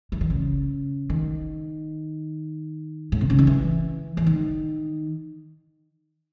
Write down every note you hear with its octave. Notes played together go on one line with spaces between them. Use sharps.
E3
D#3
C#3
D#3
A2
C3
C#3
D#3
E3
E3
D#3